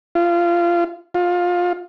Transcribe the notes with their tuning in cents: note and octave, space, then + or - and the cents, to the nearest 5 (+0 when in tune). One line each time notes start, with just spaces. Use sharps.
F4 -20
F4 +20